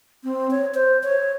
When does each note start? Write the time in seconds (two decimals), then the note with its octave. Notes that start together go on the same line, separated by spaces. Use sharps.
0.24 C4
0.51 C#5
0.74 C5
1.03 C#5